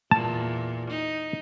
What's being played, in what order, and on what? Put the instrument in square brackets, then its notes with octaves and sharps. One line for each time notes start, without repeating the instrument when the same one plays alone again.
[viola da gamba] E2 A#2 [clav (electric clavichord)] A5
[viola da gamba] D#4